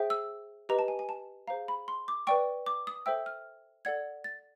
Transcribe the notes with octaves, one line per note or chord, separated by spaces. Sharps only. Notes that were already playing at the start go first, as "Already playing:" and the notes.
Already playing: G#4 C5 E5 G5
E6
G4 B4 D#5 A#5
A5
G#5
G#5
A5
G#4 C5 F5 A#5
B5
C6
D6
B4 D5 G5 C#6
D6
D#6
A4 C5 E5 G5 E6
F6
A4 D5 F#5 G#6
A6